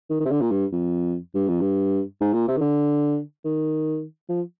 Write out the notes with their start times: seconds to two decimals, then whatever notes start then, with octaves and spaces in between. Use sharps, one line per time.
0.10 D#3
0.20 D#3
0.25 C3
0.30 D3
0.41 A#2
0.51 G2
0.72 F2
1.35 G2
1.48 F2
1.61 G2
2.21 G#2
2.33 A#2
2.47 C3
2.57 D#3
2.61 D3
3.44 D#3
4.29 F3